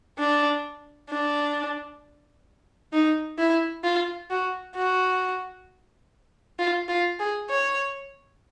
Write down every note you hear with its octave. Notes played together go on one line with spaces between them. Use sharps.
D4
D4
D#4
E4
F4
F#4
F#4
F4
F4
G#4
C#5